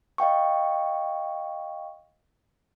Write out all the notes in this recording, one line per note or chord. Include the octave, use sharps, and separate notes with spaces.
D#5 F5 G5 C#6